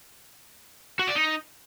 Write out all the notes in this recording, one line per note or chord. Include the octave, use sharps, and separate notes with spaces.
F#4
D5
D#4